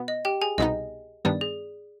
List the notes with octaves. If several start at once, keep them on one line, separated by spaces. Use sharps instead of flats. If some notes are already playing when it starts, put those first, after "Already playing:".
Already playing: B2 B3
D#5
G4 G5
G#4 G#5
C2 B2 B3 D#4 D#5
G2 D#3 G3 B3 D4 D5
G#4